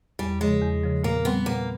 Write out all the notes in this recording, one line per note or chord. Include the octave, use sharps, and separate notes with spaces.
E2 G3
C#3 F3 G#3
E2
C#3 F3
A#2 A#3
G3 B3 C4
A#2 A#3